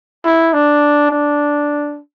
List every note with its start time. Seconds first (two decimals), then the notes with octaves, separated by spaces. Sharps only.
0.25 E4
0.53 D4
1.11 D4